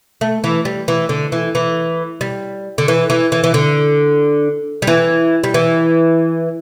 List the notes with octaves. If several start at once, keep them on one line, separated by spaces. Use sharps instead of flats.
A3
E3
G3
E3
D3
E3
E3
G3
D3
E3
E3
E3
E3
D3
G3
E3
G3
E3